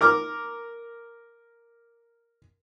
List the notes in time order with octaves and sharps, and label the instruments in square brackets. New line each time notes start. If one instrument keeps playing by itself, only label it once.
[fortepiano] A#4 D6 F6